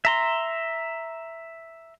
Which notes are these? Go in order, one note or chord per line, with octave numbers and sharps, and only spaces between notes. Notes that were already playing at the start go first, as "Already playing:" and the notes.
E5 A#5 C6